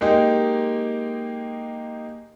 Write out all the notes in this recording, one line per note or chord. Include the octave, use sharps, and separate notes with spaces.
G#3 A#3 D#4 G4